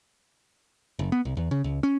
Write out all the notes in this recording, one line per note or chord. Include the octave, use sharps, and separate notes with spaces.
F#1
B3
C2
E2
C#3
C#2
C#4